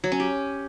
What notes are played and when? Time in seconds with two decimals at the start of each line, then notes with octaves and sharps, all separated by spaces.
0.04 F#3
0.12 C#4
0.20 G4